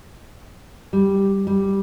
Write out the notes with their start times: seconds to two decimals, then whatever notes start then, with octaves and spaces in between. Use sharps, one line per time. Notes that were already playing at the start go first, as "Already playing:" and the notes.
0.93 G3
1.47 G3